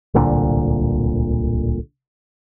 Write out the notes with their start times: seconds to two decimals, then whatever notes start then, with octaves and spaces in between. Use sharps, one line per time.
0.14 D1 C2 A#2 D3